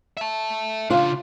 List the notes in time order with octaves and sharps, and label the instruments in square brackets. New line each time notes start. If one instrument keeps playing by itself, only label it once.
[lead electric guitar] E5 A5
[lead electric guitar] C#3 D4 [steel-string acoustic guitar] F4